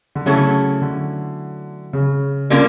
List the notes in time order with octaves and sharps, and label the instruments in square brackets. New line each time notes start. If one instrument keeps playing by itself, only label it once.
[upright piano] D3
[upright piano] C#3 [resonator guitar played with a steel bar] F#3 A3 C#4 E4 A4
[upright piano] D3
C#3
[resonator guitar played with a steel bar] D3 G3 A#3 C#4 F4